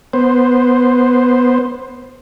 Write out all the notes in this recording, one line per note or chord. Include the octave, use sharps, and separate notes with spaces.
B3 C5